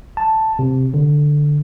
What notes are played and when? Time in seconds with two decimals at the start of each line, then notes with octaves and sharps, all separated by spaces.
0.17 A5
0.59 C3
0.94 D3